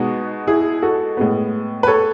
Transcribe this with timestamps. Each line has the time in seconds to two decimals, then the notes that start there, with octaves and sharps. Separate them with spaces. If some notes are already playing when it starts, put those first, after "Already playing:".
Already playing: B2 G#3 B3 D#4 F#4
0.47 E4 G#4
0.82 F#4 A4
1.17 A2 G#3 B3
1.83 B4
1.87 A4 C#5